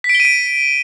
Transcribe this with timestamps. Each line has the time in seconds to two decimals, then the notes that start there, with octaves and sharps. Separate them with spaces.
0.04 B6
0.09 D7
0.15 G7
0.20 D#7
0.25 D7